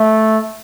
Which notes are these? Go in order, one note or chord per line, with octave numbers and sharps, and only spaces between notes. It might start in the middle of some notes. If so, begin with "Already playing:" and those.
Already playing: A3